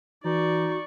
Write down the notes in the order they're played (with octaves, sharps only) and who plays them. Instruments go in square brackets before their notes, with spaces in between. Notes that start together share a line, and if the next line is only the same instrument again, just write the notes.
[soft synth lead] E3 [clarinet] D#4 [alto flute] F#4 [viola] D5 C#6